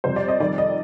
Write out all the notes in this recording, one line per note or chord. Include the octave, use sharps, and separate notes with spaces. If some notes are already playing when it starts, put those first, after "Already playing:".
F2 C3 G3 C5
D5
D#5
F2 D#3 G3 D5
D#5